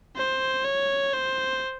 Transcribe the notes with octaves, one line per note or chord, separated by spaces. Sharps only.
C5
C#5
C5